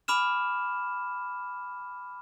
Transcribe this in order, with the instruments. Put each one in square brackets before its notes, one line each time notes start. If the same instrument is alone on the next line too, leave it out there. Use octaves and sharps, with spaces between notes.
[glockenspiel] G#5 B5 D6 F6 E7